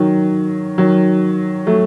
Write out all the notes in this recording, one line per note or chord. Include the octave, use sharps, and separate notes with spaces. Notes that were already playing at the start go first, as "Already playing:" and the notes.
Already playing: D#3 F#3
D#3 F#3
F#3 A3